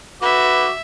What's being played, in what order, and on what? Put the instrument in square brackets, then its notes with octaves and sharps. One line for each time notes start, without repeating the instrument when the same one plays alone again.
[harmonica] F#4 D6 [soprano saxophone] B4 [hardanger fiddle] E5